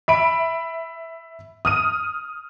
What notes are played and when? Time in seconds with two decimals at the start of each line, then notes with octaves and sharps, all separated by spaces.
0.08 E5 B5 D7
1.65 D#6 F6 D#7